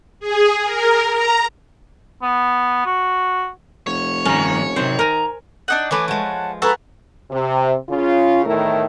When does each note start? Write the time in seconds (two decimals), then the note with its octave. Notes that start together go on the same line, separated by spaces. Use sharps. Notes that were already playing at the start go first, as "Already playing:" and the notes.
0.20 G#4
0.64 A#4
1.12 A#5
2.22 B3
2.86 F#4
3.87 F1 C#5
4.25 G2 D#3 C#4 A#5
4.76 C3 D#3 F#3 C4 C5
4.99 A#4 G#5 A#5
5.68 D4 D#4 F#5
5.91 E3 A3 B4 C#5 G#5 D6
6.08 F3 G#3 F#5 A5
6.62 F#4 G#4 A4 B4 A#5 B5
7.30 C3
7.89 C#3 F4
8.46 E2 A2 D#3 A3 E4 A#4